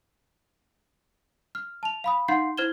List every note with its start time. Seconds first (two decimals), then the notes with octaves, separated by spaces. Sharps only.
1.55 F6
1.83 A5 F7
2.04 F5 B5 D#6
2.28 D#4 F5 F#5 C6 G6 C7
2.57 E4 C5 F6 G#6 E7 G7